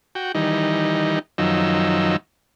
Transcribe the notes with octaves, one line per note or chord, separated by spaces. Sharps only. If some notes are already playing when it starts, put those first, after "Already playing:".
F#4 G5
D#3 E3 G3 D#4
F#2 D#3 F3 F#3 D#4 E6